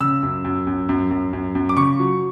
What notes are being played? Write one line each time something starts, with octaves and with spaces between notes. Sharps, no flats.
C#3 E6
F#2
F#2
F#2
F#2
F#2
F#2
F#2
D6
C#3 C#6
F#3